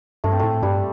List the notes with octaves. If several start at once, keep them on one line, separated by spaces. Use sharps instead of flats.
G2 A3
C4
A2 A3
G2 G3